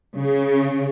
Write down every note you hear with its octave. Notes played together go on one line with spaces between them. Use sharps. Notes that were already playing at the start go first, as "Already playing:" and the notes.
C#3